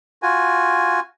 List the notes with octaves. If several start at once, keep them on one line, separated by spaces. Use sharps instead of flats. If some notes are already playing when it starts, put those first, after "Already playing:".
F4 F#4 G#5